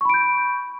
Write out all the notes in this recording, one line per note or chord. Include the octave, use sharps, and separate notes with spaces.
B5 C#6 G6 D7